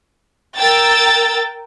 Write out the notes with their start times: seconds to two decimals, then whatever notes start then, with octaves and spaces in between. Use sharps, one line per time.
0.58 A#4 G5 E6 A6